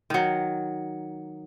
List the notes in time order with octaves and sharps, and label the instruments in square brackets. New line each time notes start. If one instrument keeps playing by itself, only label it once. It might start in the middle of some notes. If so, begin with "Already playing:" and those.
[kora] D#3 F#3